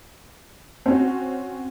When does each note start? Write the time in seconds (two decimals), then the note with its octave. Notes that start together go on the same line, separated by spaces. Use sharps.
0.86 C4 C#4 F#4